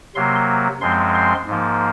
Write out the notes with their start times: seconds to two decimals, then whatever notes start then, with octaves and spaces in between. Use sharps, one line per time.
0.15 C3 F#3 A#3 C6
0.81 F#2 F3 G#3 C4 C6
1.14 C6
1.47 G#2 F3 A#3